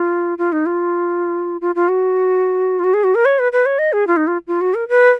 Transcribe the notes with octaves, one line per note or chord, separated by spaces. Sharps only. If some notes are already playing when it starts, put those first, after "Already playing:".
Already playing: F4
F4
D#4
F4
F4
F4
F#4
F4
F#4
G#4
F#4
A#4
C#5
B4
B4
C#5
D#5
G#4
F4
D#4
F4
F4
F#4
A#4
B4